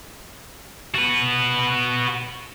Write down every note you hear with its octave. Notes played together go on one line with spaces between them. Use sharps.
F#4 B4